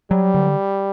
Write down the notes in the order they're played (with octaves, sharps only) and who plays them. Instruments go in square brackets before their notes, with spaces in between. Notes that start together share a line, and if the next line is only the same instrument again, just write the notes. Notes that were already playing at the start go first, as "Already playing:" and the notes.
[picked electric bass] F#3 [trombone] G3
[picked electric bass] D3